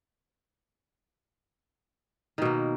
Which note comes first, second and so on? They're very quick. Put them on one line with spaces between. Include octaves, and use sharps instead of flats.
D#3 B2 A#3